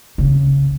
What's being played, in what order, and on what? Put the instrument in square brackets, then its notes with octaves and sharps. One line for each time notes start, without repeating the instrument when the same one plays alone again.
[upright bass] C#3